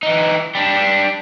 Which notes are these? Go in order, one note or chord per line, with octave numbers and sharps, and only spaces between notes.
E3 D#4
G3 D4